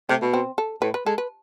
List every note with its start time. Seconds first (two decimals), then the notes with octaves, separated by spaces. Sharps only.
0.09 C3 A3
0.22 B2
0.34 C4
0.58 A4
0.82 A2 B4
0.94 B4
1.06 G#3 A4
1.18 B4